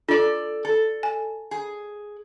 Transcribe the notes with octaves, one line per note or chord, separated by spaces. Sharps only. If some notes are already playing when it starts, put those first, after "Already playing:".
D4 F4 A4 D5
A4
G#5
G#4